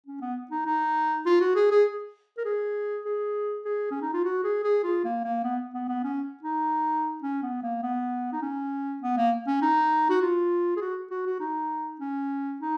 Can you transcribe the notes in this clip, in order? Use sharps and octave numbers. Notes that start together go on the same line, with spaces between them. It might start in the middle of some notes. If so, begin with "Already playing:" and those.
C#4
B3
D#4
D#4
F4
F#4
G#4
G#4
A#4
G#4
G#4
G#4
C#4
D#4
F4
F#4
G#4
G#4
F4
A#3
A#3
B3
B3
B3
C#4
D#4
C#4
B3
A#3
B3
D#4
C#4
B3
A#3
C#4
D#4
F#4
F4
G#4
F#4
F#4
F#4
D#4
C#4
D#4